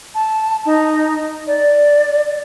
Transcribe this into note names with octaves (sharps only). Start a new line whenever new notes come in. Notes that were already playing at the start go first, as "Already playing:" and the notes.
A5
D#4
D5